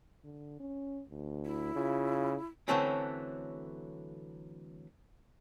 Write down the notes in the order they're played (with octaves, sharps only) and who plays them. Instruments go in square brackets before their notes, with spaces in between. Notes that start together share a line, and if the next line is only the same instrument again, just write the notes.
[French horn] D3
C#4
D2
[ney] E4
[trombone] C#3 [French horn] F4
[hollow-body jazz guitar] D3 E3 F#3 A3 C4 C#4